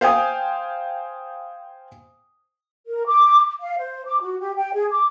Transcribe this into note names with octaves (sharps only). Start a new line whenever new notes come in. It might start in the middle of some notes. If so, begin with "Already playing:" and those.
C5 F5 G5 G#5 D#6
A#4
D6
F5
C5
D6
F#4
G4
G5
G#4
D6